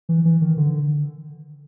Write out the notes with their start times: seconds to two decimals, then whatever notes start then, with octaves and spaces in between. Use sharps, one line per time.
0.09 E3
0.25 E3
0.42 D#3
0.57 D3